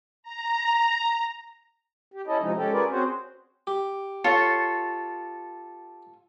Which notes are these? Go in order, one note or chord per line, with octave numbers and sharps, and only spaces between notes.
A#5
G4
C#4 E4 A4 D#5
C3 F3 G#3 D#4
G#3 C#4 G4 A4
C#4 F4 G#4 A#4 B4 D5
C4 C#4 F#4 G#4 C5
G4
F4 A4 C#5